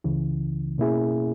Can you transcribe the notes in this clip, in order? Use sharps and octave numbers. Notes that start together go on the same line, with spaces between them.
C#2 C#3 E3
B2 A#3 C#4 E4 G#4